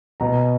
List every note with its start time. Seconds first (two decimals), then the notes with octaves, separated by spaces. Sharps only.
0.20 B2 A#5